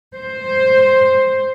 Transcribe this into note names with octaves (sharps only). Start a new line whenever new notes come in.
C5